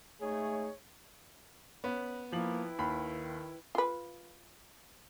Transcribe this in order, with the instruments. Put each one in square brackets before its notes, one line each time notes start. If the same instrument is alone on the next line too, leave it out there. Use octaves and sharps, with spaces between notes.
[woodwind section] G#2 C#3 A3 [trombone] G#4 [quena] C#5
[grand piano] B3 [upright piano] C#4 [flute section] B5
[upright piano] F3 F#7 [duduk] A#3 [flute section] E4 B4 G5
[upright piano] D#2 [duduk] D#3 [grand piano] B5
[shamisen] F4 B4